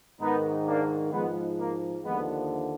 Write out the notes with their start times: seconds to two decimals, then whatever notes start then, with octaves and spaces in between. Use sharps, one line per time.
0.21 G#2 D#3 B3 D#4
0.67 A#3 D4
1.12 G#2 F3 G#3 B3
1.59 A#3
2.04 D#2 D3 F3 G#3 B3